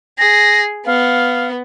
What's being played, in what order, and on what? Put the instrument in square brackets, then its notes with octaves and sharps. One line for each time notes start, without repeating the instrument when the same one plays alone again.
[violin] G#4 [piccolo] A#6
[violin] B3 [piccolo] F5